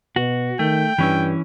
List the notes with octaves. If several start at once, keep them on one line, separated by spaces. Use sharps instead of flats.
B2 F#4
D#3 A3 G5
G2 E3 C#4 E4